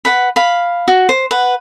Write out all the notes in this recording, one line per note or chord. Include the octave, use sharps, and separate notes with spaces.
B4 F#5 B5
F5 B5
F#4
C5
B4 F#5